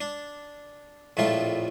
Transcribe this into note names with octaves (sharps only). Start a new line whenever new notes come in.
D4
A#1 F2 A2 A3 F4 A4